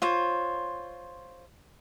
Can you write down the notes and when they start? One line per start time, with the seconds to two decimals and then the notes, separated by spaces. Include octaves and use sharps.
0.02 F4 C5 C#5